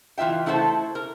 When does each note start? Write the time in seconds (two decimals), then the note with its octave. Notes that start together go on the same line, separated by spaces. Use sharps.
0.18 E3 A3 F4 E5 G5
0.46 A3 E4 A4 C5 F#5 A5
0.95 A#4